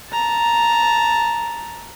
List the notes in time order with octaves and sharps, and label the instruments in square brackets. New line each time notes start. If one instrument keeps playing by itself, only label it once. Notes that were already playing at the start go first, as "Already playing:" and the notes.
[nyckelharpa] A5 A#5